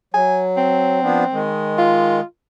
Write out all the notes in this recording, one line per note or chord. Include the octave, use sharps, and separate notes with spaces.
F#3 G#5
C4
F3 B3 D4
D#3 G#3
F4